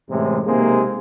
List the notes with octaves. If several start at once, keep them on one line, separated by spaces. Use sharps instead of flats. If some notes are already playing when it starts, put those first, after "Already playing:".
F#2 A2 C3 E3 G#3
B1 C3 G#3 A#3 G#4 C5